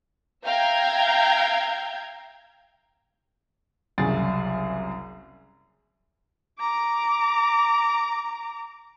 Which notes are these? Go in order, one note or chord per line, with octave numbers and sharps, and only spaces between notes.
E5 F5 G5 A#5 G6 G#6
F#1 C2 F#2 G#4 A6
A#5 D6